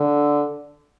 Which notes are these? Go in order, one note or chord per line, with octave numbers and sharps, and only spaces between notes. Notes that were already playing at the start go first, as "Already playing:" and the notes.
Already playing: D3